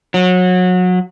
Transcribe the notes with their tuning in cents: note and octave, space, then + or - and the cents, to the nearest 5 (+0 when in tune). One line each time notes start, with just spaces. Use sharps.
F#3 -25